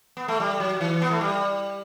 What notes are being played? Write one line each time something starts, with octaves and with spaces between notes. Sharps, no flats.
B3
A3
G3
F#3
E3
B3
A3
G3